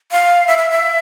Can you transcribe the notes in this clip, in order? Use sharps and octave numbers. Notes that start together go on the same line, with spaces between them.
F5
E5
E5
E5